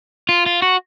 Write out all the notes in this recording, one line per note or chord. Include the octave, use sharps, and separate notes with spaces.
F4
F4
F#4